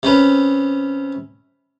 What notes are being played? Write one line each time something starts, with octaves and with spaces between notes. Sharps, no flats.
C3 C#4 B4